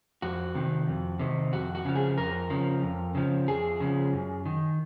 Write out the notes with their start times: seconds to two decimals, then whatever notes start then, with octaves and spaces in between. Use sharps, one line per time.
0.22 F2 F#4
0.55 C3 D#3
0.88 F2
1.19 C3 D#3
1.53 F2 F#4
1.75 F#4
1.85 C#3 F3
1.95 G#4
2.18 F2 A#4
2.50 C#3 F3
2.83 F2
3.15 C#3 F3
3.48 F2 G#4
3.80 C#3 F3
4.13 F#2
4.45 D#3